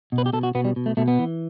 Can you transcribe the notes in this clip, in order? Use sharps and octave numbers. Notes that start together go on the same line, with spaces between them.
B2
B4
G4
B2 A4
F#4
B2 B3
G3
B2
A3
B2 A3
B3
E3